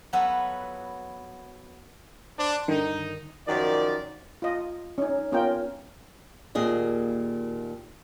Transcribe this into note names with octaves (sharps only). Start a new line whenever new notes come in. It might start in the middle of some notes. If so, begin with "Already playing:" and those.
F#3 B3 F4 F#4 A4 B4
D4 C5
G2 D3 D#3 D#4
F#2 D#3 F3 D5
F4 D#5
C#4 D#4
B3 C#4 F4 A#4 G5
D#2 A#2 G#4 D#5